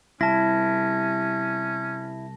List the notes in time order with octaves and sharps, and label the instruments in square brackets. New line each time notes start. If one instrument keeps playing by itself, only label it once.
[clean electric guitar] C2 [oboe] C#4 [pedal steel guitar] E4 [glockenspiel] A5 A#6